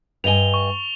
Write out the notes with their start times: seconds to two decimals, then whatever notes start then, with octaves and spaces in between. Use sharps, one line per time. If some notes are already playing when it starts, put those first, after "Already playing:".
0.24 G2 D#5 G#5 F7 G7
0.54 C#6